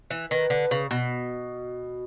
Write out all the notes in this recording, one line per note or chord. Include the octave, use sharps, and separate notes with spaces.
E3
D#3 B4
D3
C#3
B2